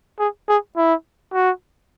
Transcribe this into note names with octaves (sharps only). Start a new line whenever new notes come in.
G#4
G#4
E4
F#4